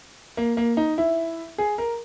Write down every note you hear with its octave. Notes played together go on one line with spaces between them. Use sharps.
A#3
A#3
D#4
E4
G#4
A#4